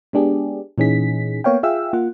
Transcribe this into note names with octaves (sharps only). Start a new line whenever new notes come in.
G#3 B3 D4 G4 G#4
A#2 E3 C#4 D#4 G#4 B6
A#3 B3 C#5 F5 G5
F4 G#4 E5 F5 G5 E6
A#3 F4 F#5